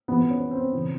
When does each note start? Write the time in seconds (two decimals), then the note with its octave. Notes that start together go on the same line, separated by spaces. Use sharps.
0.08 F2 C3 E3 B3
0.29 C#4
0.51 C4
0.73 C#3 E3